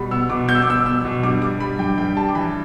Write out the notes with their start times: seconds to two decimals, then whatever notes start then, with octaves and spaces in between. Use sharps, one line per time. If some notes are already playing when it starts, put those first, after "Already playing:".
Already playing: B2 G3 B5
0.11 B3 E6
0.30 B2 D6
0.48 B3 G6
0.55 E6
0.62 D6
0.67 B3 E6
0.86 B3 E6
1.05 B2
1.23 G2 D6
1.42 G3 D6
1.60 G3 B5
1.79 G2 G5
1.98 G2 G5
2.16 G3 A5
2.28 D6
2.35 E3 B5